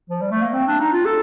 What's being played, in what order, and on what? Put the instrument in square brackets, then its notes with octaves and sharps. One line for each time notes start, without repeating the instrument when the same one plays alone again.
[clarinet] F3
G3
A3
A#3
C4
D4
D#4
F4
A4